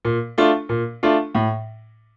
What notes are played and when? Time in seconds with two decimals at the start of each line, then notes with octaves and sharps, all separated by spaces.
0.05 A#2
0.38 A3 D4 F4
0.69 A#2
1.03 A3 D4 F4
1.35 A2